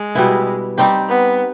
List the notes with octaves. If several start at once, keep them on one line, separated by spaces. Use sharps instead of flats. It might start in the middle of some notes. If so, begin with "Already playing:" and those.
Already playing: G#3
B2 G3 B3 E4
G3 C4 D#4 G4
B3